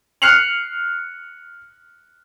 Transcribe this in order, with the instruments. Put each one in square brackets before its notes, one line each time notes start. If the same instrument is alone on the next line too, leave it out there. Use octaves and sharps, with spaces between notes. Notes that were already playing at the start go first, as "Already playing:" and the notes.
[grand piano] F6 F#6 C7 C#7 F7 F#7